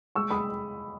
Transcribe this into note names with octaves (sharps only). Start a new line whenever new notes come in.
G#3 C#6 E6
G#3 B5 D#6